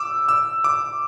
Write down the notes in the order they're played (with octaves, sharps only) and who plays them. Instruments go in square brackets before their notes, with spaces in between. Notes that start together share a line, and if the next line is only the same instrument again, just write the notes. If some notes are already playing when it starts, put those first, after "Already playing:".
Already playing: [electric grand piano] D6 E6
E6
D6